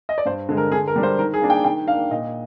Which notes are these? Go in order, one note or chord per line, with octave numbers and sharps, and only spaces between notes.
D#5
D5
G2 C5
D3 G#3
A#4
D3 G#4
A#4
G3 D4
C5
D#3 A#4
G#4
A#3 D4
G5
D#3 G5
A#3 D4 F5
A#2 D#5